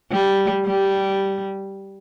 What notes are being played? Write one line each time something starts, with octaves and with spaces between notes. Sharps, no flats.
G3
G3